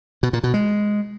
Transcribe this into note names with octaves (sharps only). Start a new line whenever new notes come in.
B2
A#2
B2
G#3